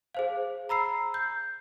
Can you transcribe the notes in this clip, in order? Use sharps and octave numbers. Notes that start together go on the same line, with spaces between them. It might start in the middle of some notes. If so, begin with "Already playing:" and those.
G#4 C5 F5
A#5 B5 E6 C7
G6